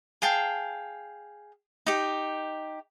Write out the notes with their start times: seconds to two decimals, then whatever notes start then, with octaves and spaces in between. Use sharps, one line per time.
0.22 G#4 F5 G5 A5
1.86 D#4 G4